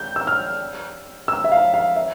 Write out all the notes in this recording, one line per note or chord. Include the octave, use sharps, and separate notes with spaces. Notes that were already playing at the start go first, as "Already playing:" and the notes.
Already playing: G6
E6
F6
E6
E5
F5
F5
E5